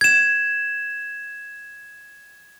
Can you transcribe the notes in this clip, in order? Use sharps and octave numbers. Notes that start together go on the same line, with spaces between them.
G#6 E7